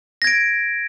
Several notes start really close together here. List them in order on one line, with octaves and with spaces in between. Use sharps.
A#6 G#6 D7